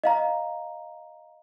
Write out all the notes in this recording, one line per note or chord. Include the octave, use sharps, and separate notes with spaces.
D#5 F5 A#5